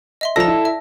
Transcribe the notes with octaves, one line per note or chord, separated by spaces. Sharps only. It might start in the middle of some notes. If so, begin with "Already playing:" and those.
D#5 E5 C6
F3 A4 D5 A#5 A#6
E4
E5